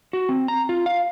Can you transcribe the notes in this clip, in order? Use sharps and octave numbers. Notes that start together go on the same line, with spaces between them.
F#4
C4
A#5
F4
F5